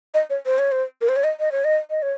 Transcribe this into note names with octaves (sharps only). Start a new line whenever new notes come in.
D#5
C#5
C5
C#5
C5
A#4
C5
C#5
D#5
D#5
C#5
D#5
D#5
C#5